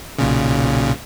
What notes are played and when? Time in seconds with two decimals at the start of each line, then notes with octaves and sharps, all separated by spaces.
0.19 B1 A#2 C#3